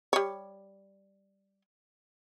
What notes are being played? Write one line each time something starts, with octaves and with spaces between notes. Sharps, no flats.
G3 C#5